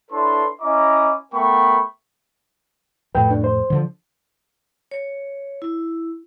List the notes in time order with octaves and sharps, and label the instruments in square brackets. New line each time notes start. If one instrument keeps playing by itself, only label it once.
[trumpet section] D4 E4 A4 B4 C#5 C6
C#4 E4 D#5 A#5 D6
A3 B3 A#4 G5 B5 C#6
[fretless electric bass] F2 A2 [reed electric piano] B4 G5
[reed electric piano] D4
C5
[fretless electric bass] D3 F3
[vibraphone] C#5
E4